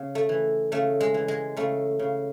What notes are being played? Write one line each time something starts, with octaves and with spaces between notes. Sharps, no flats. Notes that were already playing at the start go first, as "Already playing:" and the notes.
Already playing: C#3
A3
E3
C#3 A3
G#3
E3
G#3
C#3 A3
C#3